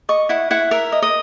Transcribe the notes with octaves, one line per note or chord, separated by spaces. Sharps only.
D#5 C#6
E4 F#5
E4 F#5
A#4 E5
D#5
D#5